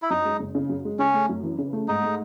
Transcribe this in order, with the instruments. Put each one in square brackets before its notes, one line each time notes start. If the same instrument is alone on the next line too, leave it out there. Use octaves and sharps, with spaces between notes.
[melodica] E4
[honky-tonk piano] F#2 [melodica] D#4
[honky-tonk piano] G#3
F#1
C#3
F#2
G#3
[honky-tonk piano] C#3 [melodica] C#4
[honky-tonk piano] A3
F#2
E3
C#3
A3
[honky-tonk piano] G#2 [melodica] D#4
[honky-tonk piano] A3